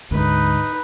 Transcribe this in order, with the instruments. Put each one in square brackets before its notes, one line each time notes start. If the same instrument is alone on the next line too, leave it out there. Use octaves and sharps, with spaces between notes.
[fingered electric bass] D2 G#2 [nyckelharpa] D#4 B4